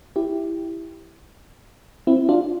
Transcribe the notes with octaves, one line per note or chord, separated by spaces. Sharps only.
E4 G4
C4 E4
D4 F4